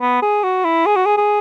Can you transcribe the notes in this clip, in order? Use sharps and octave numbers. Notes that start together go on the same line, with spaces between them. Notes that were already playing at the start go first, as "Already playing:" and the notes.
B3
G#4
F#4
E4
G#4
F#4
G#4
G#4